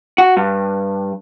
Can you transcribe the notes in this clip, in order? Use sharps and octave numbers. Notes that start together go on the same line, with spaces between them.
F#4
G2